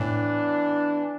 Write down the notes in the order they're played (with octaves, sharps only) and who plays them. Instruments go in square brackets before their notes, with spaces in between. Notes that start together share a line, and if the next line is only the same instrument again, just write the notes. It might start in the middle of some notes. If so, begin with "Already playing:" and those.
Already playing: [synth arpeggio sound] A2 [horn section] E3 B3 D4